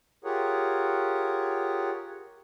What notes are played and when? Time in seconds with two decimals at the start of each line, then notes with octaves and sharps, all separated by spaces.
0.25 F4 G4 G#4 A#4 C#5 F#5